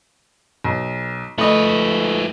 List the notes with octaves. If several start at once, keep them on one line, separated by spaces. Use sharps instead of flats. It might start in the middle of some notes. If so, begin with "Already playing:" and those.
B1
F3 A3 B4 D#5